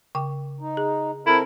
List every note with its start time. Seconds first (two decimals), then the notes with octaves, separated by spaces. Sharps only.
0.15 C#3 G5 D6
0.60 D#4
0.77 G#4
1.26 C4 E4 A4 A#4